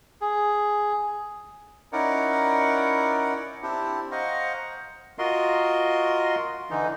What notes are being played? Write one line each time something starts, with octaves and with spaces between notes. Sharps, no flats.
G#4
C#4 D#4 E4 A#4 D5 F#5
C4 D4 E4 G4
C5 D#5 F5 F#5 A#5 C#6
F4 F#4 A#4 D#5 C6
D3 E3 D#4